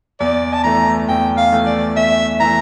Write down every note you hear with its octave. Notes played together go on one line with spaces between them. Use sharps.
E2 D5
A5
E3 A3 A#5
E2 G5
F5
E3 A3
D5
E2 E5
E3 A3 A#5